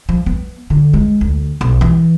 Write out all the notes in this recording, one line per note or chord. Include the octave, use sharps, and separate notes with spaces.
F3
B3
D3
G#3
D2
B1
E3